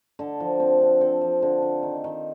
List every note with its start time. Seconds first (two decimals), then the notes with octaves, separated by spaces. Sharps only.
0.19 D3 A4
0.40 F3
0.60 C4
0.81 D3
1.01 C4 A4
1.21 F3
1.42 D3
1.62 D3
1.83 D#3
2.04 D#3